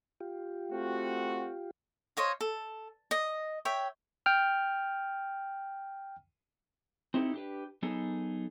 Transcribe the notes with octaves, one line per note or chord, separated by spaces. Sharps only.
F4 G4
A3 C4 F#4
C5 C#5 D#5 F5
A4
D#5
C#5 E5 G5
G5 F6
C4 D#4 E4 G4 A4
D4 G4 B4
F#3 B3 D#4 G#4 A4